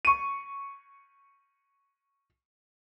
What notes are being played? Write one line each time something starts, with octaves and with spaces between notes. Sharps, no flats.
C#6 D#7